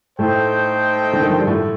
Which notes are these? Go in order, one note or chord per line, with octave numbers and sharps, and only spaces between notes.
A2 A3 D#4 A4 C5 G5
D3
D#3
F3
G3
A2 A3